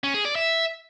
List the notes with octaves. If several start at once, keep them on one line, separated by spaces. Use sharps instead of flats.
C#4
G#4
D5
E5